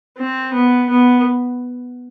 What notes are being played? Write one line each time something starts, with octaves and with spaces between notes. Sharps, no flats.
C4
B3
B3